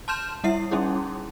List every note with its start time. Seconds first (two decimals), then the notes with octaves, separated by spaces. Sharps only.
0.08 A5 C6 F6 G6 E7
0.44 G3 E4 E5 C7
0.71 G3 C#4 D#4 E4 G#4